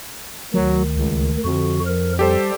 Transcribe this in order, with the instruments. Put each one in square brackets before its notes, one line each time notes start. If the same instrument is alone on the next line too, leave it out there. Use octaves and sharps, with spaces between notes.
[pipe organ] D2 D#3 [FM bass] F#3
[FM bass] C#2
[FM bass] F2 [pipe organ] D3 F#4
[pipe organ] F3 A#4
[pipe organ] G3 [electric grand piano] G4 A4 C5